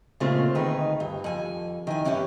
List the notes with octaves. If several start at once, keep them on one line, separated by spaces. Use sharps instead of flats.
A#2 C#3 G#3 A3 C4 F4
D2 D#3 D#4 G#4 B4
G2
F2 G#5
D#3 E3 G#5
G2 E3 C#4 E4 G4 C#5